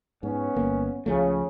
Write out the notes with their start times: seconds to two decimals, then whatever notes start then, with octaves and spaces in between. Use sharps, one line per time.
0.23 G#2 B3 C#4
0.56 G1 A#3
1.06 C#2 C#3 F3 A3